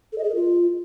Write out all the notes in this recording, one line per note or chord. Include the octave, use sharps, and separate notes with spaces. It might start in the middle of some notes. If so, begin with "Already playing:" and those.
A4
D#5
G#4
A#4
F4